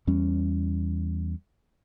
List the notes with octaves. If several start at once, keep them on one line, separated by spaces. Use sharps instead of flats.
E2 G3 C#4